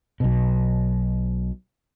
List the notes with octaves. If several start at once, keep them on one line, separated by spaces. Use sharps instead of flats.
B1 B2